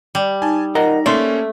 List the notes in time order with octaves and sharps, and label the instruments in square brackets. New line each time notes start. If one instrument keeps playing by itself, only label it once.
[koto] G3
[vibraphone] D#4 [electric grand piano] G#5 A5
[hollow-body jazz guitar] A#4 D#5 F#5 [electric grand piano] A#5
[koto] A3 [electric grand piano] A#3 C#4 [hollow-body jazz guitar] D5 C6